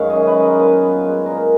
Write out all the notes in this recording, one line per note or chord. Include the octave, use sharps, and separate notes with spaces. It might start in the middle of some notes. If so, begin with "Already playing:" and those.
Already playing: F#2 D#3 G#3 F5
D#5
C#4
B4
G#3
A#4
A#2 B4
B3
G#3
A#2 A#4